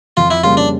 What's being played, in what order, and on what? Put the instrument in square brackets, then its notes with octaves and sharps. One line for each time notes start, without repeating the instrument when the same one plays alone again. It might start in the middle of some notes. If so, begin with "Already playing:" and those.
[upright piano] F2 [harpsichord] F4
[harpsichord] E4
[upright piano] C#3 G3 A#3 C#4 [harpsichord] F4
[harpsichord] D4